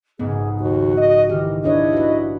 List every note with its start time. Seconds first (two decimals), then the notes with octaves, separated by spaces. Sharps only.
0.19 A#1 G#2 C#3 B3 G#4
0.59 D#2 F#4
0.97 D#5
1.30 D#3 E3 G4 F6
1.64 D4 E4 B4 C#5 D#5
1.93 F#4 B4